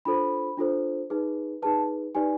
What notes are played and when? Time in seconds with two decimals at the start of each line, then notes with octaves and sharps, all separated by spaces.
0.05 D4 F4 A4 C5 B5
0.57 D4 F4 A4 C5
1.10 D#4 G#4 B4
1.62 D#4 G#4 B4 A5
2.15 D#4 G4 B4 D5 G#5